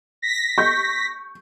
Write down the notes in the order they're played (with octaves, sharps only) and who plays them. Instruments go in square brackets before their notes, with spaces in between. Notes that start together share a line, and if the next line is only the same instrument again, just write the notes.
[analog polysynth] A#6 B6
[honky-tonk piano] C#6 G6